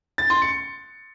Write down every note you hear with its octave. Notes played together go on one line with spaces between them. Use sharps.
A6
C6
C#7